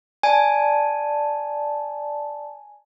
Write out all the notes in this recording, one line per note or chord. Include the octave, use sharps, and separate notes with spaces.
D5 G#5 A5